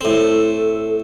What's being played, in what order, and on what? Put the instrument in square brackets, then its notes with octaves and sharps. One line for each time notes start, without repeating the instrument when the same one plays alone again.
[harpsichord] A2 C4 [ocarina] A4